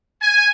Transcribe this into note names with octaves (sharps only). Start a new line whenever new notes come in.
G#5